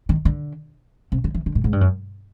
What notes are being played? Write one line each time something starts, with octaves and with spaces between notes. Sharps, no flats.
D#3
D3
C3
D3
E3
D3
A2
G#2
G2
F#2